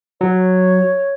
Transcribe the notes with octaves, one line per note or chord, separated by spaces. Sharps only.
F#3 C#5